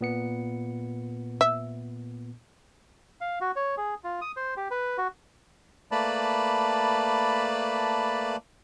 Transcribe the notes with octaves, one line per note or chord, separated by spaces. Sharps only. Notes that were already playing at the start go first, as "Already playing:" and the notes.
A#2 B3 C#7
E5
F5
F#4
C#5
G#4
F4
D#6
C5
G4
B4
F#4
A3 A#3 B4 D5 A5 B5